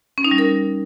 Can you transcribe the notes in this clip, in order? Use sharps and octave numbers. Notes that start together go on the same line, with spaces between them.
C#4
D#4
G3
A#4